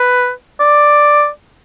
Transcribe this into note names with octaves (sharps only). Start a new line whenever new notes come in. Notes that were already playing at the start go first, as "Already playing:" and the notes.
Already playing: B4
D5